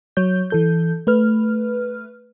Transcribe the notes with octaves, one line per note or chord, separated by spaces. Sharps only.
F#3 C#5 G6
E3 A4 G6
A3 B4 F6